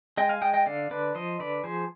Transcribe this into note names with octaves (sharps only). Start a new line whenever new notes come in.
G#3 D#5 G5
F5 G#5
G#3 D#5 G5
D#5 G5
D3 D5 F5
D3 B4 D5
F3 C5 D#5
D3 B4 D5
F3 G#4 C5